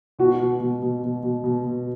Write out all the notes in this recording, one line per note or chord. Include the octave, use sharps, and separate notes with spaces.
B2 F#4
B2
B2
B2
B2
B2
B2
B2